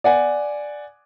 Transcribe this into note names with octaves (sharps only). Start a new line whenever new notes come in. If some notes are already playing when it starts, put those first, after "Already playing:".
D5 F#5 G#5